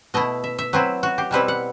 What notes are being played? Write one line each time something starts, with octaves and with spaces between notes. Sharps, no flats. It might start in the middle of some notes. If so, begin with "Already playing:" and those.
B2 A3 E4 D#5
E5
E5
F#3 C4 E4 B4
F#4
G4
B2 G3 C4 E4 B4
F#5